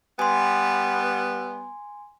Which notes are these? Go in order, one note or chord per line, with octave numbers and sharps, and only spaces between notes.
G3 B3 G#5 C6